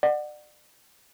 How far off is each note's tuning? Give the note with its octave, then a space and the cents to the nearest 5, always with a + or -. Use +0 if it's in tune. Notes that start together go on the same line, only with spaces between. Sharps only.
D5 +35 F#5 +0